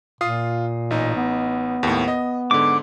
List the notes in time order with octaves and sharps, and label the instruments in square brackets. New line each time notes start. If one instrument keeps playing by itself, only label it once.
[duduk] A#2 [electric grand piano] F4 D#6 C7
[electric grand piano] A1 D#4
[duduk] B3
[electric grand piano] D#2 A2
D#5
[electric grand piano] G#2 D3 [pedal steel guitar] D6